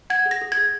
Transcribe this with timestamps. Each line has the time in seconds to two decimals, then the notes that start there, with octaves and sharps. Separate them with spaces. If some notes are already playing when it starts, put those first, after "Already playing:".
0.10 F#5 G#6
0.26 G#4
0.31 A#6
0.42 G#4
0.52 G#6
0.57 G#4